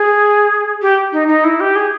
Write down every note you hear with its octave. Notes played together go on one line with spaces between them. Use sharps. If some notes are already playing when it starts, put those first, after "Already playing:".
Already playing: G#4
G4
D#4
D#4
E4
G4
G#4